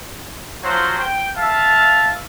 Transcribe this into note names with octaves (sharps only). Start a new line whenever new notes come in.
F3 F#3 C5
G5
E5 F5 A5